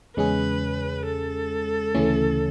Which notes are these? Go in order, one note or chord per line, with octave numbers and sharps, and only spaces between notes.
E2 C#3 G#3 C#4 G#4 B4
A4
D2 C#3 E3 A3 C#4